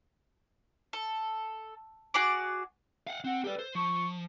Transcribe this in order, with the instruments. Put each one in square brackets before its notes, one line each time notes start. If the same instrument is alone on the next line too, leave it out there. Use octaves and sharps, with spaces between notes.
[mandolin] A4
F#4 G#4 D5 D6
[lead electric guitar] F5 F#5
[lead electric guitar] C4 [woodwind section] F#5
[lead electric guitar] G4 D5 [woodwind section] A4 B4
[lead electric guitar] C5
[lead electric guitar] F3 [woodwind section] C#6